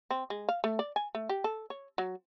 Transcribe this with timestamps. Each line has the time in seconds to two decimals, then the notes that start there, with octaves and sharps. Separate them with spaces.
0.10 C4
0.30 G#3
0.49 F5
0.64 A3
0.79 D5
0.96 G#5
1.15 A3
1.29 G4
1.44 A4
1.70 C#5
1.98 F#3